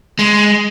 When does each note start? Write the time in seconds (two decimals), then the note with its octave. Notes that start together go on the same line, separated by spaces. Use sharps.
0.19 G#3